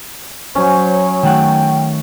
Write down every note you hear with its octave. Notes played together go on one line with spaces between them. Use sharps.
F#3 C#4 C5
D#3 A3 F#5 G5